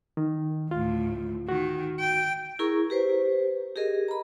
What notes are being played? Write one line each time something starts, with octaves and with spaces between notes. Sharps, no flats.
D#3
D2 A2 F4
D#3 F#4
G5
E4 G#4 A#4 A#5 C#6
G4 B4 C5
G4 G#4 A#4 D#5
A#5 B5